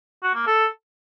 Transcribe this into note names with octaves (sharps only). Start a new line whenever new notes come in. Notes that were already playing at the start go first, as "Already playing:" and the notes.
F#4
A#3
A4